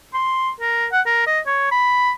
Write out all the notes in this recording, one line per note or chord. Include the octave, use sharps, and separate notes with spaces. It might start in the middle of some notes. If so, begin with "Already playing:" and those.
C6
A#4
F#5
A#4
D#5
C#5
B5